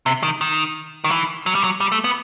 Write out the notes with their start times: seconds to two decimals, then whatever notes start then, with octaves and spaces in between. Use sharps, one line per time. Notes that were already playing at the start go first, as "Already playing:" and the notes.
0.06 C3
0.23 D#3
0.41 D#3
1.04 D#3
1.11 E3
1.46 F#3
1.55 G3
1.64 F#3
1.80 G3
1.92 A3
2.04 B3